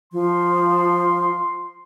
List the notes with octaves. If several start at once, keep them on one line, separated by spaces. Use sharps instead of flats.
F3 C6